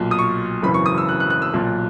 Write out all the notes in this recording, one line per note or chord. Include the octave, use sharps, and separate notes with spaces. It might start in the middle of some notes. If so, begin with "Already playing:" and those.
Already playing: B1 A#2
D#6
C#6
G#1 F#2 C#3 E3 B5
C#6
D#6
E6
F#6
F#6
F#6
E6
B1 A#2